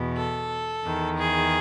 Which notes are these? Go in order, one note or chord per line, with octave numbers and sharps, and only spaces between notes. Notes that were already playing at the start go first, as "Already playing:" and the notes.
Already playing: E2 B2
A4
E2 D#3
G#4